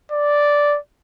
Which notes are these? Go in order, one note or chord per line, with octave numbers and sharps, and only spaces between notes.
D5